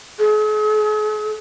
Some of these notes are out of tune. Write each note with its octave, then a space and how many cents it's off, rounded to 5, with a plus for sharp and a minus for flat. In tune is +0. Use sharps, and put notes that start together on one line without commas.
G#4 +45